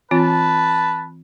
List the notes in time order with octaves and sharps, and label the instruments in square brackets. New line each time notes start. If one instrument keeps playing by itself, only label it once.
[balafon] E3 C4 F4 [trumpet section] B4 A5